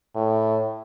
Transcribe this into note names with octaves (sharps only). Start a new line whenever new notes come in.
A2